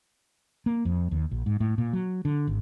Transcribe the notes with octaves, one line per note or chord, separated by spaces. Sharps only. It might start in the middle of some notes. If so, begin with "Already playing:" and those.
A#3
F2
D#2
A#1
G#2
A2
A#2
F#3
D3
G#1